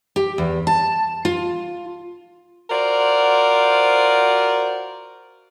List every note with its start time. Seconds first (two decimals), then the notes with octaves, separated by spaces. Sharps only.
0.16 G4
0.38 E2
0.67 A5
1.25 F4
2.70 F4 F#4 A#4 C5 D5